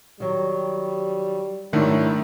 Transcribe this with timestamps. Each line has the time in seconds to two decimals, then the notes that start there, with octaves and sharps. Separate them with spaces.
0.20 D#3 F#3 G3
1.73 G#2 D3 D#3 F#3 G3 A3 E4